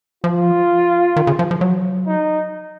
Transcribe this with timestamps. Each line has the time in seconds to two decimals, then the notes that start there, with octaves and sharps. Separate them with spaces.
0.24 F3 F4
1.16 D#3
1.27 C#3
1.39 F3
1.51 F3
1.61 F#3
2.07 D#4